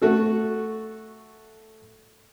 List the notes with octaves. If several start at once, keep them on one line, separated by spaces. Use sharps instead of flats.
A3 F#4 A4